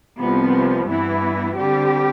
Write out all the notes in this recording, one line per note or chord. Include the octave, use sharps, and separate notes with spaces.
C2 C3 F3 B3
G2 E3 B3 E4
D3 G3 C4 G4